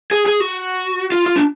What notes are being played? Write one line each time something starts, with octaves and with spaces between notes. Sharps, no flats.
G#4
G#4
F#4
F4
F4
D4